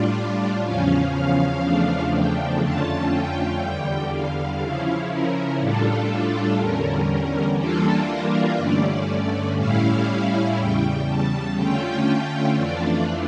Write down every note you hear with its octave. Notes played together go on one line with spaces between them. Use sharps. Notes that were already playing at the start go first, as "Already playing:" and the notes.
Already playing: A2 G3 D4 F4 D5
E2 C#3 F3 C#4 F5
F5
E2 C#3 F3 A3 D4
G5
F2 D3 A3 C#4 F4 A5
G5
E2 D3 G3
F5
C#3 F3 C#4 E4
A#4
A2 G3 D4 F4 A4
E2 D3 G3 C#4 A#4
E3 G3 A#3 D4 F4 A4
A#4
G2 D3 A3 C#4 D5
A2 G3 C#4 E4 F5
E2 C#3 G3 G5
A5
D3 A3 C#4 F4 G5
F2 E3 A3 D4 F4 D5